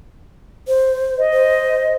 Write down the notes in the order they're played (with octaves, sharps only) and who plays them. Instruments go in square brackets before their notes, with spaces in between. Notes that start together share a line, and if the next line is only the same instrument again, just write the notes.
[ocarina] C5
[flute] D#5
[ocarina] C5